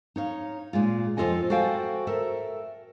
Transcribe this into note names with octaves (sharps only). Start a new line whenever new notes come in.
D#4 C#5 F5
A#2 G#3 F4
F2 F3 F4 A4 D#5 G#5
F#4 A4 C5 F5 G5 G#5
A4 A#4 E5